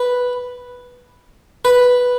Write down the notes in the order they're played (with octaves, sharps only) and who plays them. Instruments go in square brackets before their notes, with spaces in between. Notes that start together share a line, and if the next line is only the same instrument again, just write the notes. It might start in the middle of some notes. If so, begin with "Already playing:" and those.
Already playing: [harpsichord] B4
B4